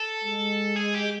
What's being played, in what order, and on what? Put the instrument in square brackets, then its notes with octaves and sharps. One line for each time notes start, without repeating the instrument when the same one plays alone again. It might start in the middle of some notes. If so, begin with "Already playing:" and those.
Already playing: [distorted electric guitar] A4
[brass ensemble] G#3
[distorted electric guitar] G#4
G4